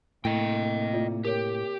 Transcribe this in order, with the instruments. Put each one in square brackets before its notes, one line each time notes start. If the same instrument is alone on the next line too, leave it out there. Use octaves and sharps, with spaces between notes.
[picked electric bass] A2 [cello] C3 A#3 [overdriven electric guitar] D#5 G5
[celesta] F4 D5
[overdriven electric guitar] G4 [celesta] A#4 C#5